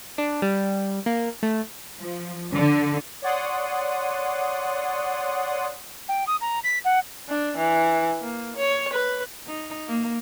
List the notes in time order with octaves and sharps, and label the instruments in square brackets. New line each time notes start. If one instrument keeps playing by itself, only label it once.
[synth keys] D4
G3
A#3
A3
[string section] F3
D3
[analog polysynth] C#5 D5 F#5 C6 D#6
[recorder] G5
D#6
A#5
B6
F#5
[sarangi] D4
E3
A#3
C#5
B4
[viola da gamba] D#4
A#3